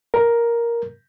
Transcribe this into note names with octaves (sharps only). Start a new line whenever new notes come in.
A#4